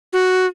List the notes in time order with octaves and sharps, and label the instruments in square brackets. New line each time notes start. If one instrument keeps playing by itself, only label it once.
[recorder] F#4